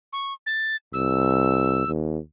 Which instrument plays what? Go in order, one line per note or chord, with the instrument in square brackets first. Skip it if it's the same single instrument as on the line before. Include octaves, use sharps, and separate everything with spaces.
[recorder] C#6
A6
[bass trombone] C2 [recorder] E6
[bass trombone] D#2